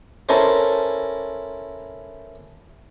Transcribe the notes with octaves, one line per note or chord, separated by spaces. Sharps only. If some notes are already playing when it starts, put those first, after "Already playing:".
C#4 E4 A4 A#4 C5